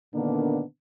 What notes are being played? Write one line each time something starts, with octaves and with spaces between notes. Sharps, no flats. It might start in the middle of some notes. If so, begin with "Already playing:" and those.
A#2 D3 D#3 A#3 B3 D4